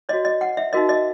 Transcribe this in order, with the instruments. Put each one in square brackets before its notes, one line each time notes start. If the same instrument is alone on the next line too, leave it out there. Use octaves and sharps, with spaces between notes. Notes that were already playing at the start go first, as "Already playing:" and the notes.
[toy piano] C#5 D#5
F#4
D#5
F#5
E5
D#4 F#4 A#4 D#5
D#5